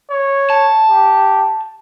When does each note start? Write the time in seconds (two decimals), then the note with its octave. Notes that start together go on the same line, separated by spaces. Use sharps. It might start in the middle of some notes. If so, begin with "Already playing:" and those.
0.10 C#5
0.50 A5
0.90 G4